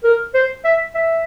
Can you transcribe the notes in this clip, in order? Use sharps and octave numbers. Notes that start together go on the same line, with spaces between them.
A#4
C5
E5
E5